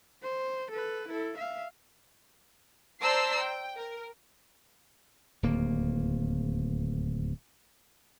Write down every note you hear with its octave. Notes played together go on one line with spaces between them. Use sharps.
C5
A4 B4
E4 A4
E5 F5
C5 D5 A5 A#5 E6 C7
G5
A#4
D1 D#2 A#3